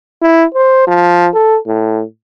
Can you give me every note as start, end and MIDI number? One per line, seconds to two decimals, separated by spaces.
0.22 0.44 64
0.55 0.85 72
0.87 1.28 53
1.34 1.58 69
1.67 2.03 45